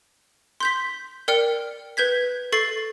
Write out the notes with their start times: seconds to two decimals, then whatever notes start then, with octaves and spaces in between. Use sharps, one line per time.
0.60 C6 G6 B6
1.28 A#4 D5 G5 F6 C#7
1.97 B4 G6 G#6 B6
2.52 A4 C#6 A6 C7